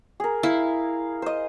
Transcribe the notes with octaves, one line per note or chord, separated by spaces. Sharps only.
G#4 A#4
E4 F5
C5 D#5